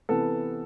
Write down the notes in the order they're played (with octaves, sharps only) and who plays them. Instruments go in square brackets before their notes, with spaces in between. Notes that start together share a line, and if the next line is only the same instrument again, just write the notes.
[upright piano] C3 E3 B3 A4